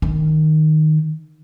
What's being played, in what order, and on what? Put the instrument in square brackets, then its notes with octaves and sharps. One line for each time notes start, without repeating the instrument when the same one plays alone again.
[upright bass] D#3